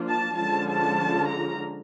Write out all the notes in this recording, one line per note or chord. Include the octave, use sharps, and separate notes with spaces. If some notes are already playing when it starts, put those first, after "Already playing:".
Already playing: F3 A#3 D4 F4
A5
D3 F3 G#3 C#4 F4 A5
A5
A#5